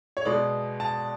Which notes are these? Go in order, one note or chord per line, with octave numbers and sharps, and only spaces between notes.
C#5
B2 G#3 B3 D5
A5